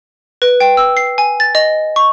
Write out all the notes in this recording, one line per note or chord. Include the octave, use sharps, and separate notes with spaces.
B4
G5
E6
C7
G#5
A6
D#5
C#6